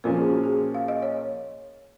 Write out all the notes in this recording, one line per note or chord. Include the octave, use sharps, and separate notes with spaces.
A#2 F3 A#3 C#4 A#4
G#4
F#4
G#4
F5
D#5
C#5